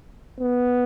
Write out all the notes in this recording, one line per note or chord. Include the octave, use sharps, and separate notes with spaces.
B3